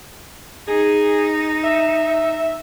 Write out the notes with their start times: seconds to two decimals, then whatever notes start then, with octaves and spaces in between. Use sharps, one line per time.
0.68 D#4 G#4
1.64 E5